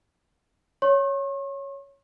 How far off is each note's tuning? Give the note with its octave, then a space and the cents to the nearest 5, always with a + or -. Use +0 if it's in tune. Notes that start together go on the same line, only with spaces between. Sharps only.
C#5 +0 C#6 -45